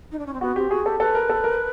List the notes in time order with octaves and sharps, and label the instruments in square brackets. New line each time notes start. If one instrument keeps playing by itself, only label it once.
[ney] D#4
D4
C#4
C4
[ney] B3 [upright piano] F#4
[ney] C4 [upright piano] G4
[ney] F#4 [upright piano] G#4
[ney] G4 [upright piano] A4
[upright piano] A4 [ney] B4
[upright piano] A#4
A4
A#4